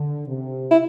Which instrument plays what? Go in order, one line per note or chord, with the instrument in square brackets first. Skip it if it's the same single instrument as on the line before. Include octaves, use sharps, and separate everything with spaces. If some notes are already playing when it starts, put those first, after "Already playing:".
Already playing: [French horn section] D3
C3
[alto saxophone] E4